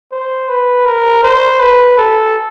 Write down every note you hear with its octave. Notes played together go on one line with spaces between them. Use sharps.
C5
B4
A#4
C5
B4
A4